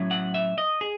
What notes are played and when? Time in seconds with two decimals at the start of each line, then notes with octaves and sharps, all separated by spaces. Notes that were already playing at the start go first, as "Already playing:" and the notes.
Already playing: A2 F#3 C#4 E4
0.11 F#5
0.34 E5
0.58 D#5
0.81 G#4